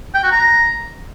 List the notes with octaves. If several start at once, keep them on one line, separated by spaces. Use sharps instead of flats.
G5
F#4
A#5